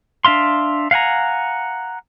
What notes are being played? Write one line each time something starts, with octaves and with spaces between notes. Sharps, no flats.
D4 E5 F5 C6
F5 F#5 G#5 A#5